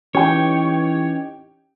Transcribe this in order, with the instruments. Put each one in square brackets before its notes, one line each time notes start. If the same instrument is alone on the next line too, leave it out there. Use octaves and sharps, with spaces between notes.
[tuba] E3 [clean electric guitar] C#4 D#4 [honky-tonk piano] G4 G5 [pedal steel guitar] C#5